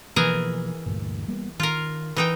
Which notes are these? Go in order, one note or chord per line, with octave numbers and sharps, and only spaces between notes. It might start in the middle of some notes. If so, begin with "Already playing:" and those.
B2 E3 F3 A#3 G#4 A#4
D2 G2 A#2
G3 A#3 B3
D#3 F4 A#4
E3 D#4 G5